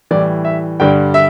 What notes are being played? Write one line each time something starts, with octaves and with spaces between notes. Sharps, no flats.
A2 E3 G3 D5
E5
G2 D3 G3 G5
E5